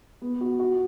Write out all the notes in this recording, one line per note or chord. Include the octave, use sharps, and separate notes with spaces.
B3
F#4
F#4